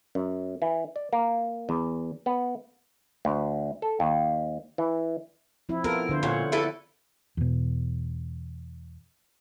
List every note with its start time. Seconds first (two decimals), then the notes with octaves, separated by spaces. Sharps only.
0.15 F#2
0.62 E3
0.96 D5
1.13 A#3
1.69 E2
2.26 B3
3.25 D2
3.82 A4
4.00 D#2
4.78 E3
5.69 F3 C4 E4
5.84 B3 F4 A4 A#4
6.09 D3 C5
6.23 A#2 F4 C#5 F#5
6.52 E4 A4 B4
7.37 E2 B2